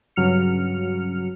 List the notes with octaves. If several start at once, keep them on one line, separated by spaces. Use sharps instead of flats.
G2 C#3 F#3 F6 C#7